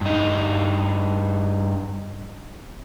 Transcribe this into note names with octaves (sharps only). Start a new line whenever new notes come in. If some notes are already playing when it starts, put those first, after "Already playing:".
G2 D#4